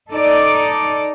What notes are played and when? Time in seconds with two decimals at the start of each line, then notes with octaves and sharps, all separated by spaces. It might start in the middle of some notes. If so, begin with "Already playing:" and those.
0.11 D#4 A4 D5